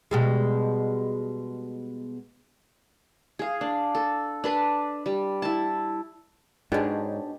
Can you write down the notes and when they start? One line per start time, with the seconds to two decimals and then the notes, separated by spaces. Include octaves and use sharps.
0.11 B2 G3 G#3
3.39 G#4 F5
3.61 D4
3.95 A4
4.44 D4 B4 A5
5.06 G3
5.42 E4 A5
6.72 G#2 B2 G#3 D4 G4 G#4 C#5 A5